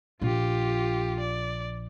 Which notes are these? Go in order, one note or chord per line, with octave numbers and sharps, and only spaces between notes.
A#1 F4 G4
D5